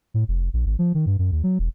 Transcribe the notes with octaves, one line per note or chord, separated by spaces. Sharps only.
A2
F1
A#1
G#1
F3
D#3
G2
F#2
D#2
F#3
E1